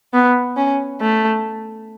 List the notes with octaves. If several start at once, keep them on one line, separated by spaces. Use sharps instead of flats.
B3
C#4
A3